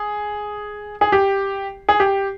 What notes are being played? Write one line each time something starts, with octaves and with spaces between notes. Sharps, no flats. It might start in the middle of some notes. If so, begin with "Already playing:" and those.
Already playing: G#4
G#4
G4
G#4
G4